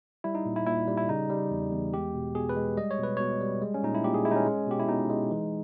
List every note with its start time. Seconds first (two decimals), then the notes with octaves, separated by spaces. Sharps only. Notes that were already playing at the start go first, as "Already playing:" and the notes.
0.24 G3 E4
0.35 D#4
0.46 A#2
0.56 E4
0.66 A#2 E4
0.88 G3
0.97 E4
1.09 C#3 D#4
1.30 G3
1.51 E2
1.72 E2
1.93 G#3 G4
2.14 B2
2.35 B2 G#4
2.49 B4
2.56 G#3
2.77 G3 D#5
2.91 C#5
2.99 B2 B4
3.17 B2 C#5
3.41 G3
3.62 G#3
3.74 C#4
3.83 A#2 D#4
3.95 E4
4.04 A#2 G4
4.14 G#4
4.25 G#3 E4
4.31 D#4
4.36 C#4
4.46 G#3
4.67 B2 G4
4.80 E4
4.89 B2 D#4
5.10 G#3
5.31 E3